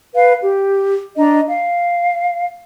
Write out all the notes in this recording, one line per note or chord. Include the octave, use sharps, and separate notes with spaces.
B4 F5
G4
D4 D#5 A#5
F5